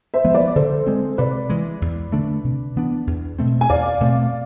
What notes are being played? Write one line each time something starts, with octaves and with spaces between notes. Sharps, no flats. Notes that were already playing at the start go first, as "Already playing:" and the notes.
C5 E5
F3 G#3 B3
B4 D5
D3 A4 C5
G#3 C4
C3 B4 D5
E3 G#3
E2
D3 A3 D4
C3
E3 B3 D4
E2
B2 A3 C4
G#5
E2 D5 F5
B2 A3 C4